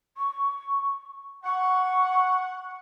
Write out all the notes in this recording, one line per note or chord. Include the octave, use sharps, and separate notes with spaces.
C#6
F#5 C#6